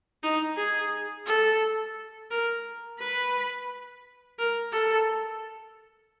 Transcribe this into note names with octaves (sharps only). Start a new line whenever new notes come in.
D#4
G#4
A4
A#4
B4
A#4
A4